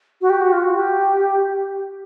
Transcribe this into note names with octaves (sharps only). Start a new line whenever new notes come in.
F#4
G4
F#4
F4
F#4
G4